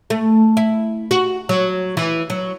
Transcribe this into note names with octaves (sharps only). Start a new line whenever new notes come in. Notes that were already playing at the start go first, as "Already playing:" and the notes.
A3
E4
F#4
F#3
E3
F#3